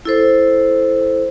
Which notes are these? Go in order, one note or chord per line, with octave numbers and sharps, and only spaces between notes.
E4 A4 C5